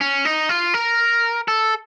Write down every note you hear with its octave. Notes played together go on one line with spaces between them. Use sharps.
C#4
D#4
F4
A#4
A4